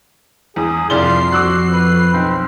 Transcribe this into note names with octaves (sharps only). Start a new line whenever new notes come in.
E2 G#4
C2 F2 F4 D5 C7 G7
F#4 D6 E6 F#6
B4 F#6
B1 C4